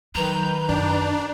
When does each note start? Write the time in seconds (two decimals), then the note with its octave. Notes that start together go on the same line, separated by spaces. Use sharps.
0.15 D#3 F#3 B4 A#5 G6
0.69 F#2 D4